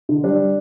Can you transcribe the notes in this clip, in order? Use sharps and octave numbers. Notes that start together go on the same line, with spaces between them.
D3
G3 D4